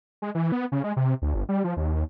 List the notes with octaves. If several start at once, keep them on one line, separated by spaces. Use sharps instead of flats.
G#3
E3
B3
C#3
G#3
C3
D2
G1
G3
F3
D#2